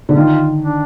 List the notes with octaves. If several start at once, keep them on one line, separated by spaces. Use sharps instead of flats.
D3
D#3 F4
D4